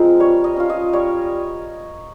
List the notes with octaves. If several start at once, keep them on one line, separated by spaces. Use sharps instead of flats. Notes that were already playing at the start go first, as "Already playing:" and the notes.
Already playing: F3 G#3 C4 A#4
G3 C#5
D#5
C#4 F4
D#5
G3 C#5